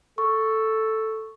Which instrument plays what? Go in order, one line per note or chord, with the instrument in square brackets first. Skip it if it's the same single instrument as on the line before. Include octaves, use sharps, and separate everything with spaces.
[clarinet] A4 [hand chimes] C#6